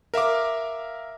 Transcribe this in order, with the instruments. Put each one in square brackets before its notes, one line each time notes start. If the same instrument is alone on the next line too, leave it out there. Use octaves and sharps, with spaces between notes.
[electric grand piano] A#4 E5 F5 D6